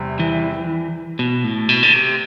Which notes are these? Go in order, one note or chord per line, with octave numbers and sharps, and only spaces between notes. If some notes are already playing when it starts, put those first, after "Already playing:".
Already playing: E2 C3 G3 C4
E3
B2
A2
B2
D3
C3